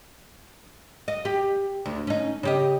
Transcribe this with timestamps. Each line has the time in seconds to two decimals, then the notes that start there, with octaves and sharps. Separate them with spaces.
1.08 D#5
1.25 G4
1.86 D2
2.07 C#4 D#4
2.43 C#3 G4 D#5